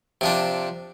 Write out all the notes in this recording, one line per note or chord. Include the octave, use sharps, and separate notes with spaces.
C3 F3 D4